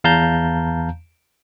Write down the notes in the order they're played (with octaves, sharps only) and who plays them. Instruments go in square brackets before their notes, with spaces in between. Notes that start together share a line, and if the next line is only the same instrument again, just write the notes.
[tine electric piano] E2 F5 A5 A#5 G6